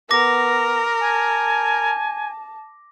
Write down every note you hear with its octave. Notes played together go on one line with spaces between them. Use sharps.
B3 A#4 D6 A#6
G#5 A5